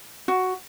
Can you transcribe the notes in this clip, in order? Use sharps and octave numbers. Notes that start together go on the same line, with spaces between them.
F#4